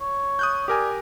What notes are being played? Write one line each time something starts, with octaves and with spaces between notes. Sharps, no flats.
C#5
D#6 F#6 G6
G4 A#4 D5 G#5